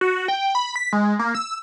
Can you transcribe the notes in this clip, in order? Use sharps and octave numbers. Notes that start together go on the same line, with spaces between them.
F#4
G5
B5
B6
G#3
A#3
E6